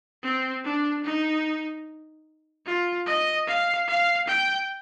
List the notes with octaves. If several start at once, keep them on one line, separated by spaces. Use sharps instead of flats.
C4
D4
D#4
F4
D#5
F5
F5
G5